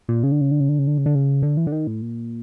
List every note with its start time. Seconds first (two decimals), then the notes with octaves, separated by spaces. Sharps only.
0.09 A#2
0.23 C#3
0.32 D3
0.41 C#3
0.51 D3
0.60 C#3
0.69 D3
0.79 C#3
0.87 D3
0.98 C#3
1.06 D3
1.15 C#3
1.42 D3
1.57 E3
1.67 D3
1.72 D#3
1.87 A2
2.02 A#2